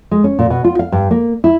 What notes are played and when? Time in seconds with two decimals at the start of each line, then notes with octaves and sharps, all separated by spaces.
0.11 G#3
0.24 C#4
0.39 A#2
0.50 B2
0.64 F4
0.79 F5
0.92 G2
1.11 A#3
1.44 E4